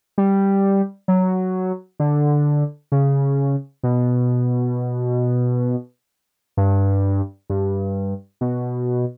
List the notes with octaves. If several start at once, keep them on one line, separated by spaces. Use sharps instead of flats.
G3
F#3
D3
C#3
B2
G2
G2
B2